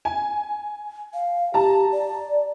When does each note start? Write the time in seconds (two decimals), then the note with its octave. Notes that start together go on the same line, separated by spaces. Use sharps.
0.05 G#5
1.14 F5
1.54 G4 A5 A#5
1.92 D5